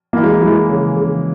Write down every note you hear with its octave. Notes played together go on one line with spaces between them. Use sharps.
E3 A#3
G#3
E3 G#3
C#3
C#3